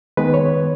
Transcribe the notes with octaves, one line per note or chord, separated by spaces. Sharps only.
D#3 G#3 B3 B4
C#5